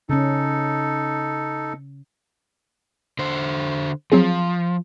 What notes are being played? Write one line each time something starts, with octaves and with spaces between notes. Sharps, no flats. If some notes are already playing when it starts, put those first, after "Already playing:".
C#3 C#4 D#4 A4
D3 C5
F3 F#3 C4 G#4